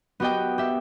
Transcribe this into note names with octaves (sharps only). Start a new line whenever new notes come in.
B3 F#4 G4 D#5 G5
G4 E5